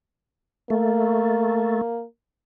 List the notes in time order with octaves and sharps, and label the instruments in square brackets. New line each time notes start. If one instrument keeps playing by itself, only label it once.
[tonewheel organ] A3 [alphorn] A#3